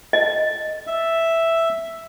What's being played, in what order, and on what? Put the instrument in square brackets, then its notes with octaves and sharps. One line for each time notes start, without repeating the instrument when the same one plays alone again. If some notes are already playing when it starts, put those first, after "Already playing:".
[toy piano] D#5
[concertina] E5